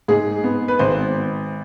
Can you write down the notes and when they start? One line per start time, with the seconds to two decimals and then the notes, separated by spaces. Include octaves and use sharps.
0.08 G#2 G#4
0.44 B3
0.68 B4
0.79 G#1 C5